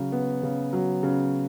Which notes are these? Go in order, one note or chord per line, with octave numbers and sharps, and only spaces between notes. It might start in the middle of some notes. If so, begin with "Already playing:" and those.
Already playing: C#3 F#3
B3
C#3
F#3
C#3